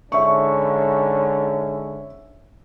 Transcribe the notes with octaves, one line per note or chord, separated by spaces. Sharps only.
G#2 D3 C#4 E5 C#6